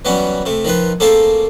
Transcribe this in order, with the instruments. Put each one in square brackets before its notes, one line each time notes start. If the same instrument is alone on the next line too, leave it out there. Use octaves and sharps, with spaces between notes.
[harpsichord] E3 F#3 G3 B3 C#4
C3 A3
D#3 F3 F4 B4
A3 A#3 C4 G#4 A4 F5